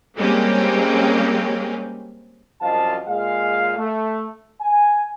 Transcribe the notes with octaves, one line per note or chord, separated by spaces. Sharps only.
G3 G#3 A#3 C4 C#4 G4
C2 F#2 F3 D#5 F5 A5
A#2 G#3 F5
A3
G#5